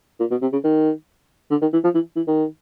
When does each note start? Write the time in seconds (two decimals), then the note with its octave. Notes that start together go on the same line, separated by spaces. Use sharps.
0.20 A#2
0.31 B2
0.42 C3
0.53 C#3
0.64 D#3
1.51 D3
1.62 D#3
1.73 E3
1.84 F3
1.95 E3
2.16 E3
2.28 D#3